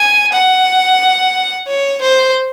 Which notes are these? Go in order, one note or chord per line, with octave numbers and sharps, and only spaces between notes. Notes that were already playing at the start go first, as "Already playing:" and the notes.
Already playing: G#5
F#5
C#5
C5